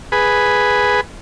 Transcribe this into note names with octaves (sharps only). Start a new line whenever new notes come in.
G#4 B4